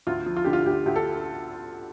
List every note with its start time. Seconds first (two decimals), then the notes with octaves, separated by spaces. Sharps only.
0.07 D2 F4
0.26 F3
0.36 F4
0.45 D3 G4
0.53 F4
0.66 D2 G4
0.86 D2 G4
0.96 A4